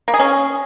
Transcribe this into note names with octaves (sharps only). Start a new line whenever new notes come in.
A#3
G#4
C#4